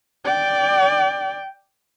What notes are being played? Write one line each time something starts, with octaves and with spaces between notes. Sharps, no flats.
D5 G5